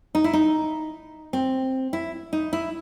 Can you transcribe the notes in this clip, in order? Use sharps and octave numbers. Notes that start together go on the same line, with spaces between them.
D#4
E4
D#4
C4
E4
D#4
E4